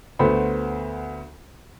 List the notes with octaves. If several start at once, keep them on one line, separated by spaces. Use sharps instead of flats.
D2 A3 B3 C5 B5